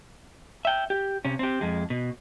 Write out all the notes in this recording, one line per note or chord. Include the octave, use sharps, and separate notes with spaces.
E5 G5
G4
C3 C#4
C4 G4
F2 G#3
B2